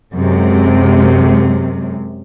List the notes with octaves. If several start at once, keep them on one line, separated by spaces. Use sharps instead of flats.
F#2 C3 G#3